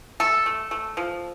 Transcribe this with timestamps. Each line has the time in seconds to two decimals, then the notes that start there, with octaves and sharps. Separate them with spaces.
0.20 A3 A4
0.46 A3
0.71 A3
0.97 F3